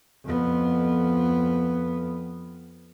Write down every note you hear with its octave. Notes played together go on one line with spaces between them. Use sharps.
F2 B3